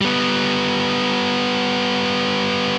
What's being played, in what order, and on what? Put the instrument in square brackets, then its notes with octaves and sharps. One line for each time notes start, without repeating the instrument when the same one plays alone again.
[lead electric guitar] G3 B3